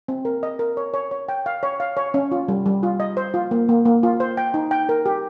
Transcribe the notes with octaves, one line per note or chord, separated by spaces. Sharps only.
C4
A#4
D#5
A#4
C#5
C#5
C#5
G5
F5
C#5
F5
C#5
C#4
F4
G3
G3
F4
D#5
C5
F4
A#3
A#3
A#3
F4
C5
G5
D#4
G5
A#4
G4